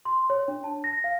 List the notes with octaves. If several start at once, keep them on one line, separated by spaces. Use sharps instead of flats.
C6
C#5
D4
A5
A#6
F5